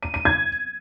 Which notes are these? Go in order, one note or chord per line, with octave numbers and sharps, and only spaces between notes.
D#7
D#7
G#6